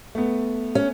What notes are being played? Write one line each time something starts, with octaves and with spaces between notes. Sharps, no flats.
A3 B3
C#4